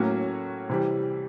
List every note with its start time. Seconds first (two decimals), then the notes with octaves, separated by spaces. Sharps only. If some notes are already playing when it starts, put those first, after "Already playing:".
Already playing: A2 F#3 A#3 C#4 F#4
0.69 C3 E3 G3